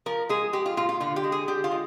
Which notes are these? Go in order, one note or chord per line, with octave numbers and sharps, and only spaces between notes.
F3 A#4
G#3 G#4
G#3 G4
F4
A#2 F4
F4
D3 F4
G4
G#3
G#4
D3 G4
F4
G#3